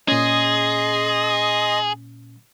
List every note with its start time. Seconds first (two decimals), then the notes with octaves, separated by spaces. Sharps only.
0.08 A#2 C#4 G#4 D#5 C6